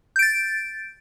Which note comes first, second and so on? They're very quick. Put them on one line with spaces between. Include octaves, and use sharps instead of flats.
G6 D7 A6